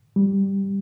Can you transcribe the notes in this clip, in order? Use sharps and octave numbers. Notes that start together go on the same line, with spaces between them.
G3